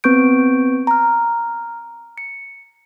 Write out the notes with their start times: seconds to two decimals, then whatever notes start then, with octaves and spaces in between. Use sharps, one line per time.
0.04 B3 C4 B4 C#6 G6 D7
0.87 A#5 F6
2.18 C#7